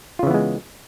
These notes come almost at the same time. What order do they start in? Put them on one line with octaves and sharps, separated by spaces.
F4 C#3 E3 B3 G#3